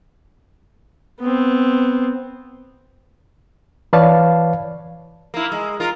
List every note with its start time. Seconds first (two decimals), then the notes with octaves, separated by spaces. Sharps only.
1.20 B3 C4
3.93 E3 B4 C#5 D5 F5 A5
5.34 A#3 E4
5.52 G#3
5.80 F4 A#4